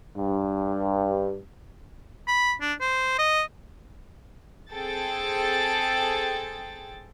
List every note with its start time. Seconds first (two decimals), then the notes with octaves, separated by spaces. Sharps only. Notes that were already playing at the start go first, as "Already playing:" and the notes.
0.16 G2
2.27 B5
2.61 D4
2.81 C5
3.19 D#5
4.72 C4 G#4 A4 G5 A6